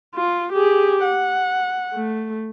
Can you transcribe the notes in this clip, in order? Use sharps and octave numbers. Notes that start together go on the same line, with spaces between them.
F4
G4 G#4
F#5
A3